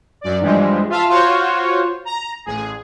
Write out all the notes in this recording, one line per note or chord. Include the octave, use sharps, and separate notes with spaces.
F#2 D5
G2 E3 F3 G3 G#3
F4 E5 F5 A5
F4 F#4 C5 C#5
A#5
A1 G#4